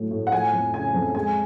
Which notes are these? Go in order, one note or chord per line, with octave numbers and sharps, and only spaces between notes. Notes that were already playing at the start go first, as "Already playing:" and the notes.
Already playing: A2 F#3 A3
A2
F#5
F3 G#5
F2
C#3 G#5
F2
G#3 G#5